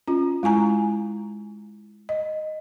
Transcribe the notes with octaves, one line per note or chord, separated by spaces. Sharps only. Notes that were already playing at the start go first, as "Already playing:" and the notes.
C#4 F4
G#3 E4 G#5 A#5
D#5